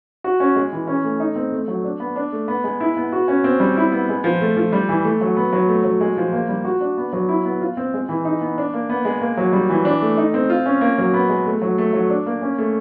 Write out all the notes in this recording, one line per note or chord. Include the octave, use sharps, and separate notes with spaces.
F#4
C#4
G#3
E3
C#4
A3
D#4
C4
A3
F#3
D4
B3
D4
A3
B3
G#3
E4
B3
F#4
C#4
C4
G3
E4
B3
G#3
F3
A3
F3
G3
E3
A3
F#3
B3
F#3
A3
F#3
G#3
F3
A#3
G3
F#4
D4
B3
F#3
E4
B3
F4
C4
G#3
E3
D#4
B3
D4
A#3
B3
G#3
A#3
F#3
G3
E3
D4
A3
D#4
C4
F4
C#4
A#3
F#3
B3
G#3
A3
F#3
A3
F#3
D4
A#3
C#4
A3